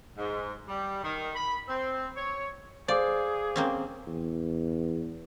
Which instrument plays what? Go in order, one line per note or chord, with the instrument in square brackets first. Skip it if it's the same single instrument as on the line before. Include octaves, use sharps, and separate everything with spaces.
[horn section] G#2
G3
D#3
B5
C4
C#5
[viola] G#4 [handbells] C5 F5 D6 [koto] D5
[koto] A#3 C4 C#4
[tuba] E2